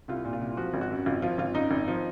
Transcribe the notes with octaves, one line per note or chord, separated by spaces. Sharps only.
C2 F4
A#2
F4
C2
F3 F#4
G#1
F#4
F#2
G#1 F4
F3 F4
G#1 F4
F#2 D#4
G#1
F3